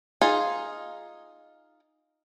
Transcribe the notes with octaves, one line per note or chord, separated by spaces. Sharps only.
D#4 F4 G#4